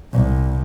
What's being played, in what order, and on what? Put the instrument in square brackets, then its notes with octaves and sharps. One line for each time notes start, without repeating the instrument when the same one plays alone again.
[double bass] C2